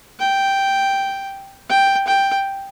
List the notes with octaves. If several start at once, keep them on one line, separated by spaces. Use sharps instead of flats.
G5
G5
G5